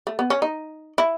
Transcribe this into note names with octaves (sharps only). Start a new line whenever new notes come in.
A3
B3
C#4
D#4
E4